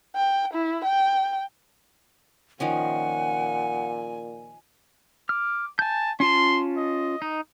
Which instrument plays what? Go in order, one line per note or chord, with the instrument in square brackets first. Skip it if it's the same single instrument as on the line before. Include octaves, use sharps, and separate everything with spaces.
[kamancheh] G5
E4
G5
[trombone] A#2 [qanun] D#3 F3 C#4 [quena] F#5 [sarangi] G#5
[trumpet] D6 [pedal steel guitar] F6
[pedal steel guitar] G#5 G6 [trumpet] A5
[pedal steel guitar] C#4 F4 A5 [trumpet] C6
[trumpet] D#5
[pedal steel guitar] D#4